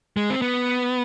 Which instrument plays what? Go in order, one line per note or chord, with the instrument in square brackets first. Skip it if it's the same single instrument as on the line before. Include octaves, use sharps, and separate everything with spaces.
[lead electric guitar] G#3
C4
B3